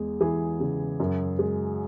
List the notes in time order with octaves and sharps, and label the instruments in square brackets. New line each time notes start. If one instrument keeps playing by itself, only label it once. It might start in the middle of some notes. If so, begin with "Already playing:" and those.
Already playing: [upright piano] E2 G#3
E3 G#4
C#3
F#2
G#3